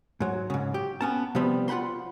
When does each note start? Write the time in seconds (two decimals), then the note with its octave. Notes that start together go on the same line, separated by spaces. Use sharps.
0.20 G#2 F#3
0.50 G#2 C#3
0.74 G4
1.01 B3 C#4 A5
1.35 C3 F3 G3 B3
1.68 F4 F#5 G5 B5 C6